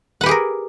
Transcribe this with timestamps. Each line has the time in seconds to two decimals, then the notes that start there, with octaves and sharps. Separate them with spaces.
0.21 F#5
0.23 B4
0.26 G4
0.29 G#4
0.31 A#4